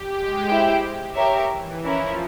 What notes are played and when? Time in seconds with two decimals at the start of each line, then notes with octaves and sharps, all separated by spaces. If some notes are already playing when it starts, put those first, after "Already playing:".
Already playing: G4
0.13 G#3
0.46 E4 G4 C5 G5
1.15 G4 A#4 C#5 E5
1.49 E3
1.84 F3 C#4 E4 A#4